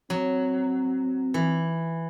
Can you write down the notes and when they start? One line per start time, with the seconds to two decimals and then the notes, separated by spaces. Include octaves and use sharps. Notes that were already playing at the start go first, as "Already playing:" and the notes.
0.10 F#3 C4
1.34 E3